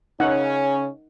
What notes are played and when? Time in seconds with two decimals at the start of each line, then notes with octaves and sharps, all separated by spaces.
0.20 C#3 C#4 D#4 F#5